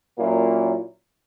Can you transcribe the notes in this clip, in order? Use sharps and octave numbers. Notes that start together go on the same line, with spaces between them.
A#2 F#3 A#3 C#4 E4